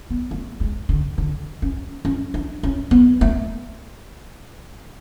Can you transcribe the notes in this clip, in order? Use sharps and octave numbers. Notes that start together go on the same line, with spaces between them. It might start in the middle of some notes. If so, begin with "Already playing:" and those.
B3
A3
G#3
D3
D3
C#4
C#4
D4
C#4
B3
A3